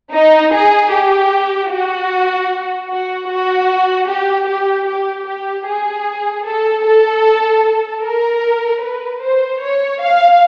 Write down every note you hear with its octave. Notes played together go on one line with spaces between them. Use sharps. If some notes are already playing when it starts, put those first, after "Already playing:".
D#4
G#4
G4
F#4
F#4
F#4
G4
G4
G4
G4
G#4
A4
A4
A#4
B4
C5
C#5
F5